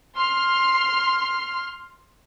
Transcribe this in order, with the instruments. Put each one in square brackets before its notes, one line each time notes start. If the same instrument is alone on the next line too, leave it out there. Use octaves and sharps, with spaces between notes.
[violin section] C6 F6